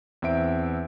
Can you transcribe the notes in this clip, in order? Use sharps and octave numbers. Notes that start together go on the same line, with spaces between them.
E2 C4 E5 D7